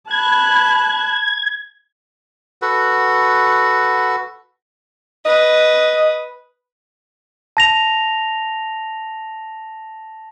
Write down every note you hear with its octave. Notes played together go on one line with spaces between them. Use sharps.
A5 B5 F#6 G#6
F#4 A4 B4 F#5
B4 D#5 D#6
A5 A#6 F7